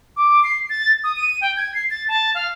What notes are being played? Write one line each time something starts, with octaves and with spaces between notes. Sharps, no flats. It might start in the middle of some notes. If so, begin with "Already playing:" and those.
D6
C7
A6
D#6
D#7
G5
G#6
C7
A6
A5
F5